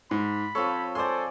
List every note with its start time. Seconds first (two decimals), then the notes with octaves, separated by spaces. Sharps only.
0.11 G#2 B5
0.55 F3 C4 A4 C#5
0.95 G#4 A4 C5 D5 C6